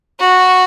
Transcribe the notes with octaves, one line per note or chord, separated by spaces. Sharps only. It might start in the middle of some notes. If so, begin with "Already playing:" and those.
F#4